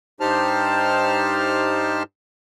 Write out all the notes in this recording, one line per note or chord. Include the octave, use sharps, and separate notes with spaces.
G2 D#4 G4 C5 A5 F6